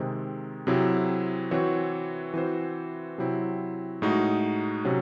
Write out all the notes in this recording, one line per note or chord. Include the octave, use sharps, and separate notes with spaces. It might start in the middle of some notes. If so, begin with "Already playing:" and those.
Already playing: C3 D#3 G#3 C4
C3 F#3 C4 E4 G#4
E3 C4 F#4 C#5
E3 C4 F#4 C5
C3 F#3 C4 E4
A2 G#3 D#4 F#4
C3 F#3 C#4